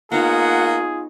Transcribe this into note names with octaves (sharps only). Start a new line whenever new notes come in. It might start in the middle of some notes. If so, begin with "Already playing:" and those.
A#3 B3 D#4 F4 G#4 C#5 F#5